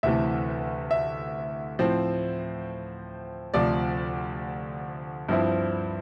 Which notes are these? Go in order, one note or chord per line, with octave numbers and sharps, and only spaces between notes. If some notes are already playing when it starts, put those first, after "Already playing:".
D2 C3 E3 A3 E5
E5
A2 F3 C4
D2 C3 F3 D5
G2 F3 C4 E4